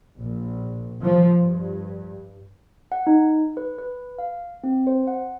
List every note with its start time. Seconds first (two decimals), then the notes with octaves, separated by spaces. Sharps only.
0.19 A#1
1.03 F3
1.39 G2
2.92 F#5
3.07 D#4
3.57 B4
3.78 B4
4.18 F5
4.64 C4
4.87 C5
5.07 F#5